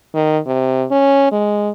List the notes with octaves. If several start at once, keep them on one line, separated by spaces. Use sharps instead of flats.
D#3
C3
C#4
G#3